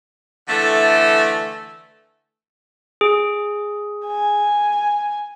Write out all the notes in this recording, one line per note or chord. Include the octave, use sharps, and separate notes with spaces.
D3 E3 A3
G#4
G#5